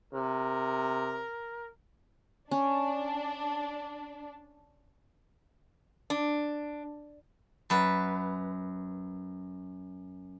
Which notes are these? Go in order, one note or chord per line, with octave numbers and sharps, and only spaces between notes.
C3 A#4
C#4 D4
D4
F#2 B4